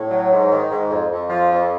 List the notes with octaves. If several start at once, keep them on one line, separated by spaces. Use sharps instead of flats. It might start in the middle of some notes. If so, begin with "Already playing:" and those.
Already playing: A2
F#3
G#2
D#3
G#2
F2
F2
F3
F2